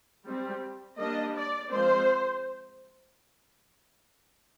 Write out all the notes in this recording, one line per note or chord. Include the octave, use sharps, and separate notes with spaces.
G3 C4
G3 A#3 D4 D#5
D5
F3 G#3 C4 C5